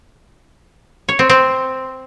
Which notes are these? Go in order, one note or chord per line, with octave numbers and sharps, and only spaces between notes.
C#5
C4
C4